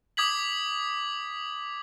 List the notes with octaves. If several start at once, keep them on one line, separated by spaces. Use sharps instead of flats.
D6 D#6 G#6 B6 F#7